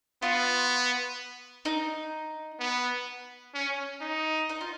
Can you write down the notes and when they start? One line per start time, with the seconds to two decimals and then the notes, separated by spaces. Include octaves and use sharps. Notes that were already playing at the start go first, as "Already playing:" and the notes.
0.22 B3 F4
1.65 D#4
2.59 B3
3.54 C#4
4.01 D#4
4.50 D#4
4.61 F4